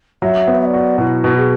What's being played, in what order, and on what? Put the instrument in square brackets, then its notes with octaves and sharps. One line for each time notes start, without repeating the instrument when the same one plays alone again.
[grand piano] F#3 [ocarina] E5
[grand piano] B3
[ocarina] E5
D5
[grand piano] F#4
[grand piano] B2 [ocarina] E4
[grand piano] B2
[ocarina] G#4